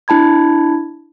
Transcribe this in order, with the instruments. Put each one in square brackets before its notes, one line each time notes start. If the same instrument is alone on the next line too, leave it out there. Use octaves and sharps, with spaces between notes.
[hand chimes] D4 E4 A5 B5 G#6